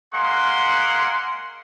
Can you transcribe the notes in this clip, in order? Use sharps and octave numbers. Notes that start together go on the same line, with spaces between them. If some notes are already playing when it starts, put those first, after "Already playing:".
G#3 A#3 C#4 F#5 C6